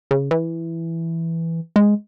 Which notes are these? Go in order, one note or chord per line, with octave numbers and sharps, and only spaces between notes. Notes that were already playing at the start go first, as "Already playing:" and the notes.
C#3
E3
G#3